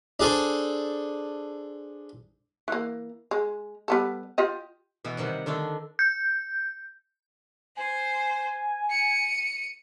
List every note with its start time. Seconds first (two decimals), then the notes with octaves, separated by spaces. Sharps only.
0.20 D4 G#4 A4 C5
2.68 E3 A#3
3.31 G#3
3.88 G3 B3 A4
4.38 F4 G4 D#5
5.04 B2 E3 B3
5.17 C3 D#3 G3 F#5
5.46 D3 D#3 A3 D4
5.99 G6
7.77 C5 G#5
8.90 C#7 D#7